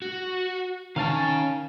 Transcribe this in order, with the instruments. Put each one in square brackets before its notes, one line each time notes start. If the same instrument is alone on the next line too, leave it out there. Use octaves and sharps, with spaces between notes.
[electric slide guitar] F#4
[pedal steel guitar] D#3 C#4 A5 [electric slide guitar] F5 G#5